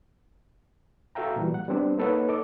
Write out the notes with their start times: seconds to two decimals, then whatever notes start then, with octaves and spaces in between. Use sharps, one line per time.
1.15 F#4 A4 E5 F5 G5 A#5
1.36 A#2 E3 G3
1.54 F#5
1.68 G3 B3 C4 D4
1.98 A#3 D#4 A4 B4 C#5 F#5
2.29 A4 D#5 D6